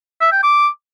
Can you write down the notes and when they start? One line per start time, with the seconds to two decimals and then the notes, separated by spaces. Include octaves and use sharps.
0.21 E5
0.32 G5
0.43 D6